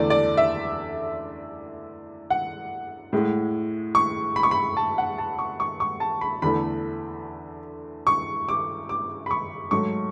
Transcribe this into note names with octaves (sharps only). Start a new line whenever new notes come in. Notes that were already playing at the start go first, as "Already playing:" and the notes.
Already playing: E2 D3 A3 D5
D5
E5
F#5
A2 G#3
C#6
B5
C#6
B5
A5
F#5
A5
C#6
C#6
C#6
A5
B5
E2 D3 A3 B5
C#6
D6
D6
B5
C#6
G#2 F#3 A3 C#6